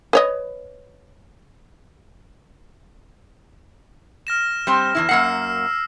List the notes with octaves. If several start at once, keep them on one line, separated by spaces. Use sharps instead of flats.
B4 C#5 D#5
F6 A#6 E7
G3 C4
E2 C#3 E4
F#2 A#3 F#5 E6 C7